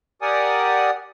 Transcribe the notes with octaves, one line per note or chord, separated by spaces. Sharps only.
G4 A#4 D5 F#5 G#5 D#6